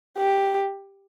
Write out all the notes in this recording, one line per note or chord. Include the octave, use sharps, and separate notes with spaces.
G4